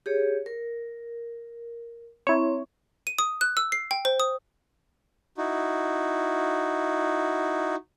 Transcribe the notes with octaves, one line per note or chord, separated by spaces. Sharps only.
G4 G#4 C#5
A#4
C4 E4 C#5 A#5
D#7
D#6
F#6
E6
C7
G5
C5
D#6
D#4 E4 F#4